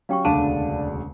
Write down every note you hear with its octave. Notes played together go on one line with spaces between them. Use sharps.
F#3 C#4 G4 F5 G5 C#6
E1 D2 C#3 D4 F5 A5 D#7